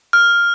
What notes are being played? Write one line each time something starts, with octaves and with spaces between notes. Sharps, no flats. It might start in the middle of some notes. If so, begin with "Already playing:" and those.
F6